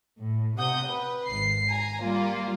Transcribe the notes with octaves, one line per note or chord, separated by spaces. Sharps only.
A2
C3 F#5 D#6 G6
B4
G#1 C7
G#5 A#5
G3 A#3 F4